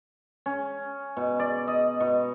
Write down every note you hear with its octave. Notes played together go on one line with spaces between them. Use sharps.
C#4
B2
D5
D#5
B2